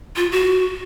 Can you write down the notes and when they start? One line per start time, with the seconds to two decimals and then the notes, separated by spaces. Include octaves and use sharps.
0.16 F4
0.32 F#4